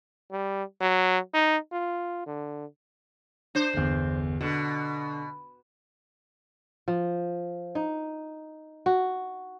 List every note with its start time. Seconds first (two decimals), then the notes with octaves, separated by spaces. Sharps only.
0.31 G3
0.81 F#3
1.34 D#4
1.73 F4
2.26 D3
3.55 D4 C5
3.74 G1 E2
4.41 B2 D3
6.88 F3
7.75 D#4
8.86 F#4